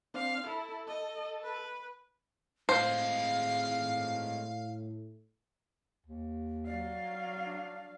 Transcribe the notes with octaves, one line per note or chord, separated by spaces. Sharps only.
C4 D4 F5
E4 A4
D#5
B4
A2 G#3 C4 C5 F5
D#2
F#3 D5 F5
D4